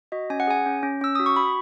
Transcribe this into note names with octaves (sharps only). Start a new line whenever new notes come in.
F#4 D#5
C#4 G#5
F#5
G#4 G#5
C#4
C#4
C#4 E6
F#4 D#6
C#6
F#4 B5